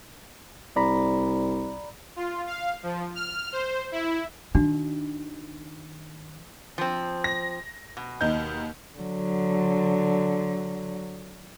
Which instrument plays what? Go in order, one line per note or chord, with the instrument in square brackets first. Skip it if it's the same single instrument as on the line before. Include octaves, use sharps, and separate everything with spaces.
[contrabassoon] C2 [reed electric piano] D5 A#5 B5
[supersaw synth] F4
F5
F3
F6
C5
E4
[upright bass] D#3 [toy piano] D4 F#4
[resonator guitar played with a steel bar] F3 C4
[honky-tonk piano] A#6
[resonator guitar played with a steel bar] B2
[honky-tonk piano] D#2 D#4 G6
[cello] D3 F#3